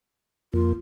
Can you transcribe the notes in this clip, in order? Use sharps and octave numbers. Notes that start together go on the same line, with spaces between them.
F2 A#3 F4